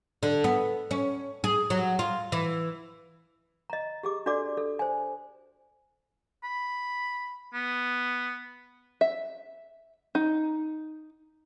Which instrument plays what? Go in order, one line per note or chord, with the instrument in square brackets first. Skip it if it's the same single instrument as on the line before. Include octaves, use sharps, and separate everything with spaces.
[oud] D3
B3
C#4
G#4
F#3
F4
E3
[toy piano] D#5 A#5
G4 G#4 D6
D4 F#4 A4 D5 D6
A4
C5 G#5
[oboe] B5
B3
[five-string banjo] E5
D#4